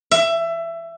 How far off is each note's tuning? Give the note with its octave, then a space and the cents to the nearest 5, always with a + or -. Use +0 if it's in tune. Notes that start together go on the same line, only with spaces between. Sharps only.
E5 +20